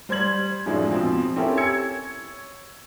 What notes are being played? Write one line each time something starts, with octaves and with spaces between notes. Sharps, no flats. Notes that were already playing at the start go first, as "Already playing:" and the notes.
G3 C5 C6 G#6 F#7
F#2 A2 F3 G#3 D4 D#4
F2 B2 F3 C4
C4 C#4 E4 G4 A4 A#4
C#5 E6 G#6 C#7